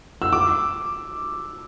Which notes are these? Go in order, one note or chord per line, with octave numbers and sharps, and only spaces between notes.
E6
D6